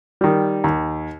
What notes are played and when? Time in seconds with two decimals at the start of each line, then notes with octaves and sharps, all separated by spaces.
0.21 D#3 G3
0.64 D#2